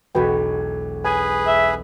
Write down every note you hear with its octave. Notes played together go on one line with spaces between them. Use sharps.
E1 B1 F#4 B4 G5
G#4 B4 G#5
E5